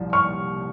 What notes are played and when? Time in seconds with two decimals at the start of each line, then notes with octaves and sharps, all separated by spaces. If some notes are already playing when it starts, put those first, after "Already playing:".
Already playing: C2 A#2 F3
0.13 C#6 F6